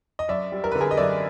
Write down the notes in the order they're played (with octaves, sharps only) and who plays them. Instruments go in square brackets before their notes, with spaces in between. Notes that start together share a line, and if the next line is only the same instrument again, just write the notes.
[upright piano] D#5
F#2 D5 E5
G3
A#4
D3 B4
G#4 A#4
D#5
F#2 D5 E5